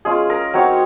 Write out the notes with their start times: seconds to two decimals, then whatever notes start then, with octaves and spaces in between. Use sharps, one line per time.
0.05 G#3 C#4 F4 G#4
0.30 A#4
0.54 F#3 C4 D#4 C#5